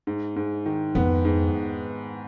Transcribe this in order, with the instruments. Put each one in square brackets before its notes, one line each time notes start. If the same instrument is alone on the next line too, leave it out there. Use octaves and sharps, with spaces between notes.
[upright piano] G#2
G#2
D#3
[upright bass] F2 [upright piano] B3
[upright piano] G#2